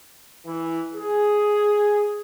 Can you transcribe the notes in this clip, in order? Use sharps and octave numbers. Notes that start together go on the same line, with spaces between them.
E3
G#4